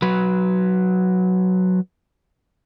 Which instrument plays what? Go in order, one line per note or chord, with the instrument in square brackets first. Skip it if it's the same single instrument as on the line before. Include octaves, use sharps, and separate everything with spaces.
[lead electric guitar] F#3 B4